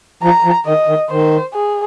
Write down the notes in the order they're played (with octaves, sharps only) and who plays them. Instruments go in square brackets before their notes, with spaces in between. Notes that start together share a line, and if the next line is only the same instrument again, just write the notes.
[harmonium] F3 [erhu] A#5
[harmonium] F3
[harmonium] D#3 [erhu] D#5
[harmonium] D#3
[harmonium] D#3 [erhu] C5
[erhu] G#4